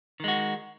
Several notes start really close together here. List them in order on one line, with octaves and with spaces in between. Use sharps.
D#3 G#3 F#4